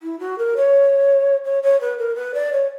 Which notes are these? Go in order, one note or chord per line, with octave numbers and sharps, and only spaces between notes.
E4
F#4
A#4
C#5
C#5
C#5
B4
A#4
B4
D5
C#5